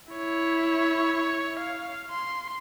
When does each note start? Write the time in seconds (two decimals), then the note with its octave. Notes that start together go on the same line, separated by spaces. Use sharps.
0.12 E4 C#5
1.60 F5
2.11 C6